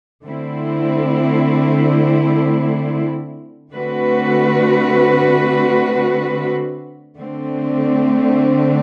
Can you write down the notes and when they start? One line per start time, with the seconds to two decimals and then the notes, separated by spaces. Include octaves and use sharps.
0.25 D3 A3 C4 E4
3.71 D3 A3 C4 F#4 B4
7.18 D3 A3 C4